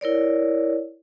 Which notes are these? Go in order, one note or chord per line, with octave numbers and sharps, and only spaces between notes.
E4 A#4 C#5 D5